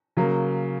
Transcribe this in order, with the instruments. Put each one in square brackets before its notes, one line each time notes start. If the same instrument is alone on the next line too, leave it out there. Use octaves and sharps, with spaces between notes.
[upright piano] C#3 F#3 A#3